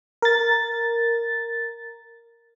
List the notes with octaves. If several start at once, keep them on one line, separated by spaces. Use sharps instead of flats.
A#4 A6